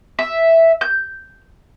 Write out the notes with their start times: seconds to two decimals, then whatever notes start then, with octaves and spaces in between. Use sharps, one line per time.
0.19 E5
0.81 G6